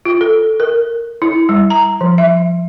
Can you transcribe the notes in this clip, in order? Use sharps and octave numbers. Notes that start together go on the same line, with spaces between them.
F4
A4
A#4
E4
G3
A#5
F3
E5